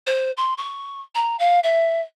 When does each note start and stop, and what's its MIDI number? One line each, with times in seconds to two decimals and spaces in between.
0.07 0.31 72
0.37 0.54 84
0.58 0.98 85
1.15 1.36 82
1.39 1.60 77
1.63 2.01 76